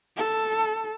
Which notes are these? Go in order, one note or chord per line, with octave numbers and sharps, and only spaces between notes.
A4